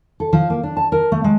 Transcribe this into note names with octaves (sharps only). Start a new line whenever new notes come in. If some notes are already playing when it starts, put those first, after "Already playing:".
A4
F3
A#3
D4
A5
A#4
A3
G#3